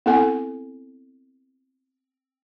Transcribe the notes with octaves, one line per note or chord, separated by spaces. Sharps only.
B3 C4 E4 A4 F#5 G#5